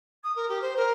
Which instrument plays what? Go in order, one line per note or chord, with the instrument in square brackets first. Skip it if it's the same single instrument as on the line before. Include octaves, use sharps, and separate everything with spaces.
[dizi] D#6
A#4
G4
C5
A#4